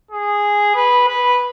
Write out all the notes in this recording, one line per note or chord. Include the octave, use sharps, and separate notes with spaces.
G#4
B4
B4